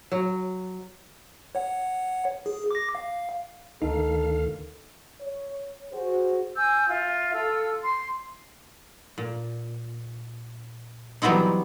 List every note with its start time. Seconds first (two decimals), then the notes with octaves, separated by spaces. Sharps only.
0.12 F#3
1.55 C#5 F#5
2.46 G#4
2.71 D6 A#6
2.95 F5
3.82 D2 D#3 D#4 A4 F5
5.21 C#5
5.92 F#4 G#4 C5
6.55 G#5 E6 G6
6.87 F4 E5
7.34 F4 A4 E6
7.82 C6
9.18 A#2
11.22 E3 F#3 G3 B3 C4 D#4